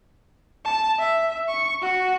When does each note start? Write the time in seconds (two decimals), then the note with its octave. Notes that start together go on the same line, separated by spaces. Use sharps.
0.65 A5
0.99 E5
1.48 C#6
1.82 F#4